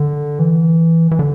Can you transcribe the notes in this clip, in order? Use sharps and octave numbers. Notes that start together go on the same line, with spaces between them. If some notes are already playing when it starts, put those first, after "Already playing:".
Already playing: D3
E3
E3
D3